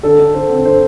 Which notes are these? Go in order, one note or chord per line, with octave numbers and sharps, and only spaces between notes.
D3 A4
D3
D3 C5
C4
D3 C5